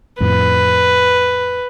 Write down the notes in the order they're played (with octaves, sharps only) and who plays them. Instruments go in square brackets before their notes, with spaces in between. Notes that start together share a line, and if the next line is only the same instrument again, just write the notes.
[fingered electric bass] F2 A2 [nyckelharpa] B4